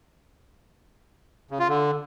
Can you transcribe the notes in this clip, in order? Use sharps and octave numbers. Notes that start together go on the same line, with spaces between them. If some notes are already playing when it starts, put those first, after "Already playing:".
C#3
F4
D3